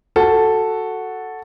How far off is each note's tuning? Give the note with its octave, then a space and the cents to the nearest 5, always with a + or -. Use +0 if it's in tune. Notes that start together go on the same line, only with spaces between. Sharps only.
F#4 +0 A4 +0